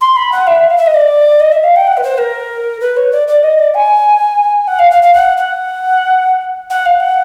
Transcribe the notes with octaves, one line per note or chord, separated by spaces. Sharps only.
C6
B5
F#5
E5
F5
E5
D#5
D5
D#5
E5
F5
G5
F#5
B4
C5
A#4
B4
C#5
D5
D5
D#5
D5
G#5
F#5
F5
F5
F5
F#5
F#5
F#5
F5
F#5